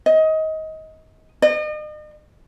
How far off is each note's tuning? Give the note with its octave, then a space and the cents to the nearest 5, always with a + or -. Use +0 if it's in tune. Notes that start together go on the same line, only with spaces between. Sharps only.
D#5 +25
D#5 -40